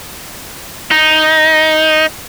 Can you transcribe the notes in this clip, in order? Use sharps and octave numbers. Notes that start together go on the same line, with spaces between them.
D#4